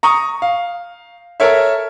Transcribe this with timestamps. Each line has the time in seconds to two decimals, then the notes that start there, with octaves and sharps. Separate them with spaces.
0.03 A#5 C#6 D#6
0.42 F5
1.40 A4 A#4 C#5 E5